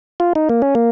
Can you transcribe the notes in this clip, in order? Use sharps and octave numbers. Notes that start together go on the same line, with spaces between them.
F4
D#4
A#3
C#4
A#3